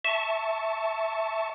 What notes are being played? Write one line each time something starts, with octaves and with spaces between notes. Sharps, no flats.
E5 A5 C#6